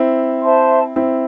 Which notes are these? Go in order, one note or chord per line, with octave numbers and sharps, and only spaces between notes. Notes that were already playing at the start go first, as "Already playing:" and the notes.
Already playing: C4 E4
C5 E5 A5 C6
C4 E4